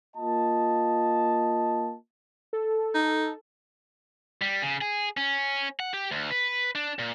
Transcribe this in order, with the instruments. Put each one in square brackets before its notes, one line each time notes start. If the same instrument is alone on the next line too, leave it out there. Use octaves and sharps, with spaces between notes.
[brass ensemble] A#3 F4 D#5 A5
[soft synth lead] A4
[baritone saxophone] D#4
[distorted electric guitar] G3
C#3
G#4
C#4
F#5
G4
D2
B4
D4
A#2